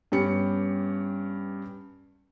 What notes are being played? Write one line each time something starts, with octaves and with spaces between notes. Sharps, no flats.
G2 B3 C#4 G4 C#7